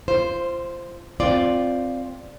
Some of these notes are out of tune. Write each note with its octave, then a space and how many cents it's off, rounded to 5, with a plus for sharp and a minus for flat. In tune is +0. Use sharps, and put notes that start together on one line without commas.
F4 -25 C5 +0
C4 +0 F4 +0 D5 +0